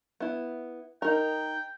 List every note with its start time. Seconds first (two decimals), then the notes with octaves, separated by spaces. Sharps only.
0.20 B3 E4
1.02 D#4 A#4 G5